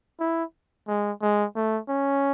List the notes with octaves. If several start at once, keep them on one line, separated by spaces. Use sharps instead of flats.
E4
G#3
G#3
A3
C#4